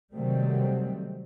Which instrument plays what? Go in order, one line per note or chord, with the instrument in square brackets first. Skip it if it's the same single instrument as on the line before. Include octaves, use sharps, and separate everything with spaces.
[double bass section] C3 D#3 F#3 G3 A3 C4